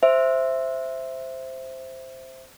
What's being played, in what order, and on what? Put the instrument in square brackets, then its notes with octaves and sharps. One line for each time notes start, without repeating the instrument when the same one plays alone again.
[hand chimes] C5 E5